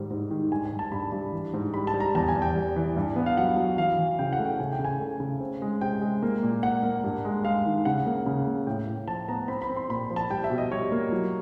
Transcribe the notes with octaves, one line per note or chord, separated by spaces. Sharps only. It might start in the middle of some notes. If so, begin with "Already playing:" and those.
Already playing: G#2 D#3 G3
G#2
D#3
G2 G#5
G#5
G2
A5
G2 B5
G2
E3
G#2
G3 B5
A5
G3
A#5
E2 A5
G#5
E2
G5
G3
E3
G2
B3
F5
F#3 F#5
F#3
E3 F5
E3
C#3 G5
F#5
A3
G5
C#3 G#5
G5
C#3
G#5
A3
C#3
C4
G#3
C3 G5
G#3
A#3
A#2
A#3 F#5
A#3
G2
G#3
G#3 F5
D#3
C#3 F#5
A#3
C#3
A#3
A2 G5
A2
F3 A5
B3 A#5
C4 B5
B5
C4
C6
A#2 B5
F3
A5
G3 G5
E5
B2
D#5
G3 C#5
A#3
F#3